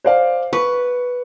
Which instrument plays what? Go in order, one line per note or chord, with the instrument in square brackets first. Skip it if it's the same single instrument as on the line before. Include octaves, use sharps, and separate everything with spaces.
[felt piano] C5 D5 F5
[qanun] B4 [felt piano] C#6